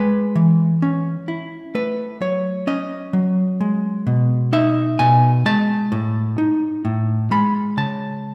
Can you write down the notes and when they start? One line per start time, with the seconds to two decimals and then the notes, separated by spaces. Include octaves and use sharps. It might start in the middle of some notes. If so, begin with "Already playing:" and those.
Already playing: G#3 B4
0.35 E3
0.82 C#4
1.28 E4
1.75 A3 B4
2.21 F#3 C#5
2.67 C#4 D#5
3.13 F#3
3.61 G#3
4.07 B2
4.53 D#4 E5
4.99 B2 G#5
5.46 G#3 A5
5.92 A2
6.38 D#4
6.85 A2
7.31 G#3 B5
7.77 C#3 A5